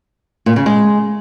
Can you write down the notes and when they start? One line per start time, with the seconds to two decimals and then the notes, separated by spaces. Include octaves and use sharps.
0.46 A#2
0.56 C#3
0.66 G#3